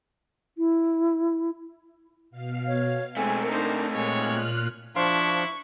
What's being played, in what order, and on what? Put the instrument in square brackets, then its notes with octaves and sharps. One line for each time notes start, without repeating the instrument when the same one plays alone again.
[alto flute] E4
[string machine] B2 F5
[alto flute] C#5
[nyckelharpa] G#3 [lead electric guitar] A3 C4 [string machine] A#4 [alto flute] G#5
[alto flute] D4 [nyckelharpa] D#4 C5
[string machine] A#2 F6 F#6 [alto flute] G#3 [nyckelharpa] C#5
[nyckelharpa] F4
[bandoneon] F3 D4 [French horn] E4 [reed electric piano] C5 F5 C6 [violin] C#6